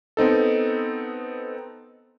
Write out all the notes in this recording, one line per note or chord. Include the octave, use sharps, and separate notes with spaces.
B3 C4 D#4 A4